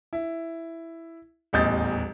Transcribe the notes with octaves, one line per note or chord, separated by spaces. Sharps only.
E4
D#1 A1 E2 D#5 G6 A6